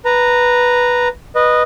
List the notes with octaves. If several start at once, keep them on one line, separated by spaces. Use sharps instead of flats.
B4 A#5
B4 D#5